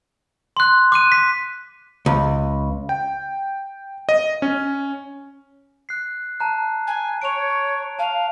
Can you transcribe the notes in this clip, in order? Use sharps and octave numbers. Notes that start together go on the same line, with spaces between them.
C6 F#6
D6 F#6 D#7
B6
C#2
G5
D#5
C#4
F#6 C7
A5 A#5 F#6
G#5
C#5 D7 F7
F5 A5